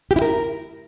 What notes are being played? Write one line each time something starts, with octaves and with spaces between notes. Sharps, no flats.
G4
E4
A#4